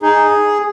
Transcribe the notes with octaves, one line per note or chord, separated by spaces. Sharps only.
D#4 G#4